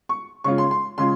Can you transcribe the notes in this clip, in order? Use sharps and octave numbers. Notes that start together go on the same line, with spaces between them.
C#6
C#3 G#3 C#4 F4 C#6
C6
C6
C#3 G#3 C#4 F4 C6